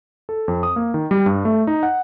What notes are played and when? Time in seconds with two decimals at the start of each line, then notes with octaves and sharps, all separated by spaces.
0.29 A4
0.48 F2
0.63 D#6
0.76 A#3
0.94 D#3
1.11 G3
1.26 G2
1.45 A3
1.67 D#4
1.83 F#5